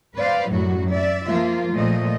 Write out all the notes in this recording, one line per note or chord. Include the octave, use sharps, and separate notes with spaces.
B4 C5 D5 F5
F#2 A2 F#3 G3 F#4
D5 E5
F3 A#3 F4
A#2 F3 A3 D#5